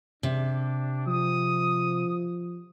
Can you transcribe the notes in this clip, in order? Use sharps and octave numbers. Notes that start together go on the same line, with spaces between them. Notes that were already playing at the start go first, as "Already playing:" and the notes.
C3 D4
F3 D#6